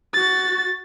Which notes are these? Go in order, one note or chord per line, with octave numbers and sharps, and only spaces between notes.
F#4 A6